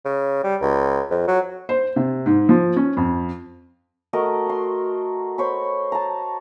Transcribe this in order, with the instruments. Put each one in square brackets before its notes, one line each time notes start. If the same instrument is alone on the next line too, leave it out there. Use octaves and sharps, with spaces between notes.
[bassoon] C#3
G3
C#2
F2
F#3
[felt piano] C5
C3
G#2
F3
C#4
F2
[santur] A3 F#4 A#4 D#5
F#5 C6
C5 C#5 B5
A5 A#5